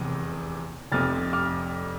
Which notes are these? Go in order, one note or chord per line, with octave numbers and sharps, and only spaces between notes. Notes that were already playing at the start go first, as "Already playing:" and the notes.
Already playing: F1 E2 C3
F1 F2 C3 F6 A6
D6 F6